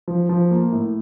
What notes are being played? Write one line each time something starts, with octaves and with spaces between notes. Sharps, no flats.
F3
F3
A#3
A2